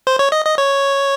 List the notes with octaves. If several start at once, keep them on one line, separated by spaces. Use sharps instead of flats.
C5
C#5
D#5
D#5
C#5